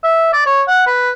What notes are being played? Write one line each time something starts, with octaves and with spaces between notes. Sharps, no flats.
E5
D5
C#5
F#5
B4